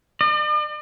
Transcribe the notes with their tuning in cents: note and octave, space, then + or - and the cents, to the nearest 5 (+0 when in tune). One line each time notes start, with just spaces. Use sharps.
D5 +45